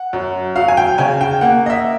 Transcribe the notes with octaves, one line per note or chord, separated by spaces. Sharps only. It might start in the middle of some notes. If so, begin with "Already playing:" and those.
Already playing: F#5
F#2
F#3 F5
G#5
G5
C#3 G#5
G5
A#3 F#5
D#5
E5